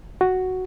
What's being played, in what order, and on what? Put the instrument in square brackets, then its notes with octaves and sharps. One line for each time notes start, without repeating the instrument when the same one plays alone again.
[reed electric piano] F#4